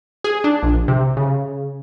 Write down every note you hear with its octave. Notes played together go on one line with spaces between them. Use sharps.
G#4
D4
A#1
C3
C#3